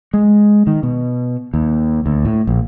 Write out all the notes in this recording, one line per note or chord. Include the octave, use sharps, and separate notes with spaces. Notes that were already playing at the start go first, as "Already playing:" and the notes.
G#3
D#3
B2
D#2
D2
A2
A#1